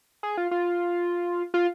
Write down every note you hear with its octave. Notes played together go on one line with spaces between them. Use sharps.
G#4
F4
F4
F4